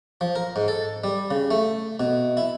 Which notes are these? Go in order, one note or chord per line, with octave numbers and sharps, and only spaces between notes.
F3
A#4
G#2
A4
G3
C#3
A3
B2
E4